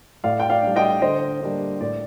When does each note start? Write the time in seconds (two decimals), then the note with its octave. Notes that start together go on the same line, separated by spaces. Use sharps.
0.24 A2 D5 F5
0.40 G5
0.50 D5 F5
0.63 G3 D4
0.76 D#5 G5
1.02 D3 C5 D#5
1.41 G3 A#3 D4
1.80 A2 D5